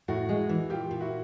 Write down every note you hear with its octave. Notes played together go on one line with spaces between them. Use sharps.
A2 E4 F#4
G#3
E3
A#2 F4 G4
A#2
E4 F#4